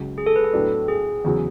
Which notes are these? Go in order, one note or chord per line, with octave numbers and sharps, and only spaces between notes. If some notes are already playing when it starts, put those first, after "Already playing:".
Already playing: C#2 C#3 F#3
G#4
A4
B4
A4
A2 F#3 B3 D4
G#4
E2 C#3 F#3